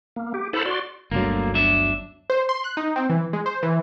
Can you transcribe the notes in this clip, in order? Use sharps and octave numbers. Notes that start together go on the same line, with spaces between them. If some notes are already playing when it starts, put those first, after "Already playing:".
A#3
G4
E4 A4 C5 F#5 A5 B5
F#4 D5 C6
G1 D2 D3 F#3 A#3
D4 E5
C5
C6
F#6
D#4
C4
E3
G#3
C5
E3